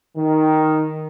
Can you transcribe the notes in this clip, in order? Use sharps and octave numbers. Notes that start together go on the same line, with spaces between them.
D#3